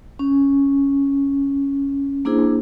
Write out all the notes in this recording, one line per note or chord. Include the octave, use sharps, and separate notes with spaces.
C#4
A#3 D4 E4 G#4 C5